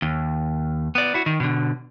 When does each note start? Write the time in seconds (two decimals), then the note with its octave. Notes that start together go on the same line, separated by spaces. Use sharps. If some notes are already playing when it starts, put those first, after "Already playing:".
0.02 D#2
0.95 B3 D5
1.14 E4 F#4
1.26 D#3
1.40 B2 D3